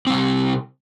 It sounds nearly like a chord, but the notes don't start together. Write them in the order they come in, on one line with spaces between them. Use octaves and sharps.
C4 G3 C3